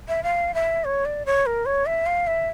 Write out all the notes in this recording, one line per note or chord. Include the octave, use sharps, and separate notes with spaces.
E5
F5
E5
C#5
D5
C#5
A#4
C#5
E5
F5
E5